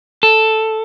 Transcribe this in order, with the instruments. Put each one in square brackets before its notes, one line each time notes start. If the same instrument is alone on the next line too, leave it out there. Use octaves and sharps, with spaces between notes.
[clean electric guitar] A4